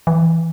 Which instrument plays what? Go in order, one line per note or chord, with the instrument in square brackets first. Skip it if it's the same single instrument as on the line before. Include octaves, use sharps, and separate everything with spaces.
[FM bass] E3